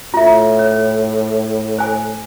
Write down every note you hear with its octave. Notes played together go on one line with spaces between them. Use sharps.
A2 F4 E5
C#5
C5 G#5